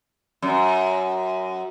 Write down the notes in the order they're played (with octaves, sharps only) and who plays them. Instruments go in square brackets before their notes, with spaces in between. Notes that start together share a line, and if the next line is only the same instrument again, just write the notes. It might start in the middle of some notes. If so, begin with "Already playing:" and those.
[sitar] F#2